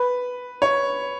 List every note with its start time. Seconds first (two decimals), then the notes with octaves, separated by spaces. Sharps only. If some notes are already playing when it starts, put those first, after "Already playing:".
Already playing: B4
0.62 C#5